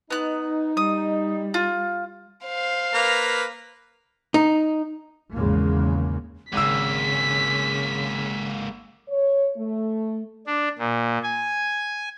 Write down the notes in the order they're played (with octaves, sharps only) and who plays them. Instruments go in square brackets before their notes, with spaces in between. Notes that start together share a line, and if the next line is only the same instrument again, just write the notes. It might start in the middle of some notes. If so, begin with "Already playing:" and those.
[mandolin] B3 F#6 [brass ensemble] D#4
[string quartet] G3 [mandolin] D#6
[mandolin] F4
[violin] C5 F5
[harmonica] A#3 B4 A#5
[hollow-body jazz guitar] D#4
[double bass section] G#1 E2 C#3 G#3 A#3
[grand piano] G#1 E6 [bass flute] C#3 [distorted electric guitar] G#3 A#3 [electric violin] B6
[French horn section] C#5
A3
[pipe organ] D4
A#2
G#5